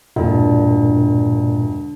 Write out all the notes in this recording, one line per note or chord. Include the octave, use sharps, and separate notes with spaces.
E1 G2 A#2 D3